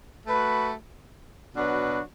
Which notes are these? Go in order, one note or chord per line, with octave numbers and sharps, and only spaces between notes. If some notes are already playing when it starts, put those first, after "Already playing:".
A3 F#4 B4
B2 F#3 D4 F#4 B4